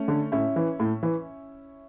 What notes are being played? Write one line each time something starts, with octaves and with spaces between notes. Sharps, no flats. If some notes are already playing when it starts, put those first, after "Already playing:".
Already playing: A3 C#4
D3
A2 C#4 E4
E3
A2
E3